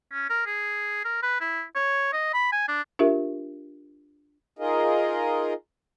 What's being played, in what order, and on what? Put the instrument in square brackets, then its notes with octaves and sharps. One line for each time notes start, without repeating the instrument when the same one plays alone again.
[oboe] C#4
A#4
G#4
A#4
B4
E4
C#5
D#5
B5
G#5
D4
[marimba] D4 F4 G4 A#4 E5
[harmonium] D#4 F4 G#4 A#4 D#5